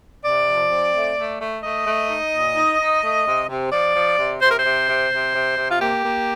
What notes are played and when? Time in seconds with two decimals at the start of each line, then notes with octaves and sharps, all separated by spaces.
0.24 C3 D5
0.48 F3
0.71 C4
0.94 A3
1.18 A3
1.41 A3
1.63 A3 D#5
1.87 A3
2.10 D#4
2.33 A#2
2.56 D#4
2.80 D#4
3.03 A3
3.26 C3
3.49 C3
3.72 F3 D5
3.96 F3
4.19 C3
4.42 C3 C5
4.51 A#4
4.59 C5
4.66 C3
4.89 C3
5.12 C3
5.35 C3
5.58 C3
5.71 F4
5.81 A#3 G4
6.05 A#3